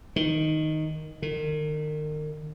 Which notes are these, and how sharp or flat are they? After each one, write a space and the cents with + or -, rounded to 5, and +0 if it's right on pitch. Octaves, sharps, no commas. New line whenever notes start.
D#3 +0
D#3 -35